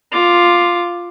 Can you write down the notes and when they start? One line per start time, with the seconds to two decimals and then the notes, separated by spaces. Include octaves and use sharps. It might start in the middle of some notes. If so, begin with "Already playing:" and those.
0.12 F4 D6